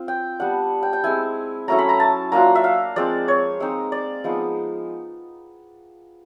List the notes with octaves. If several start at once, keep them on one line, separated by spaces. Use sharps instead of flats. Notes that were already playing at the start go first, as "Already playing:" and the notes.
Already playing: C4 F4
G5
G3 B3 D4 F#5
G5
G5
G#3 C4 E4 G#5
F#3 A3 C#4 E4 A#5
B5
A#5
A5
F#3 A#3 D4 F4 A#5
E5
F5
F3 G#3 C4 D5
C#5
G#3 C4 D#4
D5
F3 G#3 B3 D#4